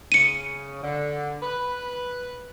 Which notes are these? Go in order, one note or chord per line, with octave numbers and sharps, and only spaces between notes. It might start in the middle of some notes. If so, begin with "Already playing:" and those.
C#3 C#7 D#7
D3
B4